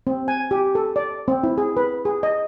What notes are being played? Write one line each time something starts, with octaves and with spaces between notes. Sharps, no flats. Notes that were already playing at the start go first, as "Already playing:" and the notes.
C4
G#5
G4
A4
D5
C4
E4
G#4
B4
G#4
D#5